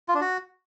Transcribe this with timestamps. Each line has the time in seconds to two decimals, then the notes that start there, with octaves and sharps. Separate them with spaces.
0.09 F4
0.15 D4
0.21 F#4